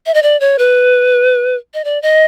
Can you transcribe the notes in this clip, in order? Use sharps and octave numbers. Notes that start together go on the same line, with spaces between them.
E5
D#5
D5
C#5
B4
D#5
D5
D#5